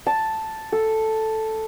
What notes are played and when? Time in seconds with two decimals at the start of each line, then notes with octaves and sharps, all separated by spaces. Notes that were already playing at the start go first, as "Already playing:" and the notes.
0.06 A5
0.72 A4